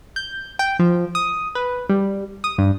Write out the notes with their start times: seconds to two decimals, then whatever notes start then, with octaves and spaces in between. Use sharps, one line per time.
0.16 G6
0.59 G5
0.79 F3
1.15 D#6
1.55 B4
1.89 G3
2.44 D#6
2.58 G2